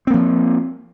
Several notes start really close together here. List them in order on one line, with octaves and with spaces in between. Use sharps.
C4 A#3 F3